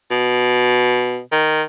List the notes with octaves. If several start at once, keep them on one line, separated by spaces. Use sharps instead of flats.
B2
D#3